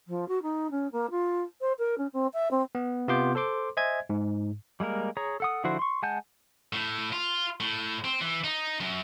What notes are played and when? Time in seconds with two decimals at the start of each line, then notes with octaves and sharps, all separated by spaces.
0.07 F3
0.28 F#4
0.42 D#4
0.70 C#4
0.92 A#3
1.10 F4
1.61 C5
1.78 A#4
1.98 C#4
2.13 C4
2.33 E5
2.51 C4
2.75 B3
3.08 C3 B3 F4 C6 D6 G6
3.35 A4 C5 C6 D6
3.77 C5 D#5 E5 G#5 G#6
4.10 G#2
4.80 G3 G#3 A#3 A#4
5.17 G#4 C#5 A#5
5.40 A4 F#5 D#6
5.64 D3 F3 E4 F#4 C5
5.79 C6 C#6
6.03 G#3 F#5 G#5 A5 G6
6.73 A2
7.12 F4
7.60 A2
8.04 C4
8.21 E3
8.44 D#4
8.80 F#2